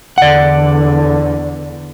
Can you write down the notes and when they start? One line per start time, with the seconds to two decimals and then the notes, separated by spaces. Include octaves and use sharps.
0.18 E2 D3 D5 F#5